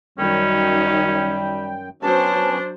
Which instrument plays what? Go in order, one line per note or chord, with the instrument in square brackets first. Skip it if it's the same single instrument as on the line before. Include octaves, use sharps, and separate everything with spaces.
[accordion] F#2 G5 [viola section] D#3 F#3 D#4 [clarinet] G3 [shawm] C#4
[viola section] F#3 C5 [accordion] B3 C#4 [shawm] D4 [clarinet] A5